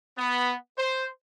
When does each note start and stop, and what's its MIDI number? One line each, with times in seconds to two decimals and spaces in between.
0.18 0.55 59
0.78 1.06 72